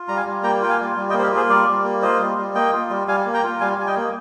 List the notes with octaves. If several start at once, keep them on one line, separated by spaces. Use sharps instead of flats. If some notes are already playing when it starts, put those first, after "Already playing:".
Already playing: F4
G3 A#5
F5 G#5
G3
A#3 G5 A#5
F4 G5
F5 G#5
G3
G3
D#5 G5
A#3 C5
G4 A#4
F4 G#4 C5
G3 A#4 D5
G3
A#3
F4 C5 D#5
G3
G3
A#3 D#5 G5
F4
G3
G3 F5 G#5
A#3
G5 A#5
F4
G3 F5 G#5
G3 G#5
D#5 G5
A#3